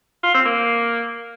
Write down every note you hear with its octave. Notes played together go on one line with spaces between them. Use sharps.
F4
C4
A#3